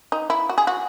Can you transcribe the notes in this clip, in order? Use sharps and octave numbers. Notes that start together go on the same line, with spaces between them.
D#4
E4
F#4
G#4
F#4